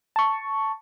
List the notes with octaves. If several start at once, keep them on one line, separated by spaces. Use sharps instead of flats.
A5 C#6